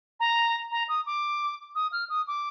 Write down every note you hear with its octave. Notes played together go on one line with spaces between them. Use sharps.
A#5
A#5
D#6
D6
D#6
F6
D#6
D6